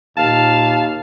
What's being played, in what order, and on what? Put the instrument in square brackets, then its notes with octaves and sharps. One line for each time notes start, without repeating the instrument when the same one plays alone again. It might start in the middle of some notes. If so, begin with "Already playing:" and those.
[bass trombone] D#2 [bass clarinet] A#2 [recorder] F5 [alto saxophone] A5